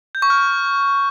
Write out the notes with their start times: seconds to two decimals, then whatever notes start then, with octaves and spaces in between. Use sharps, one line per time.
0.15 G6
0.22 C#6
0.30 F6